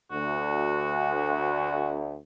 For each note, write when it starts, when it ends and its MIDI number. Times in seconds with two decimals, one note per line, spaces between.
0.11 2.14 38
0.11 1.99 66